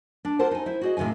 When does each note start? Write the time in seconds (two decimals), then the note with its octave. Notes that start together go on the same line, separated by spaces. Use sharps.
0.25 D4
0.39 F4 A4 A#4 C5 F#5 A5
0.51 D#4 G#5
0.66 E4 C5
0.81 F#4 G#4 D#5
0.97 A2 C3 D#3 F5 G#5